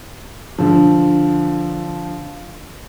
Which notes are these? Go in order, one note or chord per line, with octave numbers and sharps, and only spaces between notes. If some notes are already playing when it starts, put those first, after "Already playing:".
D3 F3